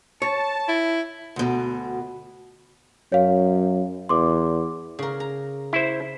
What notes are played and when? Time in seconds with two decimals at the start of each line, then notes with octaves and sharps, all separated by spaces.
0.22 C#5 A5
0.68 E4
1.36 D2 B2
3.12 F#2 C#5 F5
4.09 E2 C6 D6
4.99 C#3 A#4
5.20 A#5
5.73 E4 C5